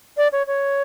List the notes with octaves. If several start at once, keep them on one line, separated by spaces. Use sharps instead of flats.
D5
C#5
C#5